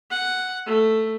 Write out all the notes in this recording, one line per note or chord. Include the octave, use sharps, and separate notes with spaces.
F#5
A3